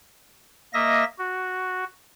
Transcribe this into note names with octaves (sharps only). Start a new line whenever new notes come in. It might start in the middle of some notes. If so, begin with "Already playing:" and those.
A#3 D#5 E5 A#6
F#4